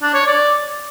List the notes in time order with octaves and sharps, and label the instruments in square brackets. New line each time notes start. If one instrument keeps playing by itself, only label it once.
[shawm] D4
C#5
D5